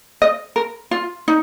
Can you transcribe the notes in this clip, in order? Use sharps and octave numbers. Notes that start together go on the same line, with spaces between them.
D#5
A#4
F4
D#4